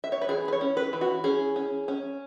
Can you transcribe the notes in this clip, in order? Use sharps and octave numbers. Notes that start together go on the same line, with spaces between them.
E5
C#5
B4
E3 G#4
B4
C#5
C#4
B4
E3
F#4
C#4 G#4
C#4
C#4